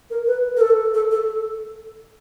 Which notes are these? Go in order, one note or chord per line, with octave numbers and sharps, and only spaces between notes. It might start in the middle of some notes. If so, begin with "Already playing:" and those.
A#4
B4
A#4
A4
A4
A4